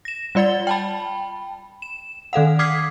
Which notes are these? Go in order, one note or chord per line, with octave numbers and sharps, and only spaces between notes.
A#6 E7
G3 F4 D5 F#5 A6 G7
G5 A5 B5
E7
D#3 A4 F5 F#5
D6 D#6 F6 G#6 B6 C7